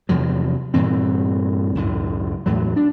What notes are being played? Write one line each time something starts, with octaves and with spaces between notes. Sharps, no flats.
E2 C3 F3 F#3
G2 A#2 E3 C4
C#2 F#2 A2
E2 A2 F#3
D4